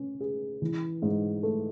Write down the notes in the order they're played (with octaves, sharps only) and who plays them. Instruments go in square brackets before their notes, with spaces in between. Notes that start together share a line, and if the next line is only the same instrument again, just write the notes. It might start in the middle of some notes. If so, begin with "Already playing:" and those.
Already playing: [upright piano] C#4
G#4
E3
G#2
A3